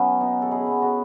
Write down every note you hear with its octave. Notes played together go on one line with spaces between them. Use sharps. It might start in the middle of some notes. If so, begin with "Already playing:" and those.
Already playing: F#3 B3 C#4
B2 D#4
A4
E4 G#4
F#3 B3
F#4 A4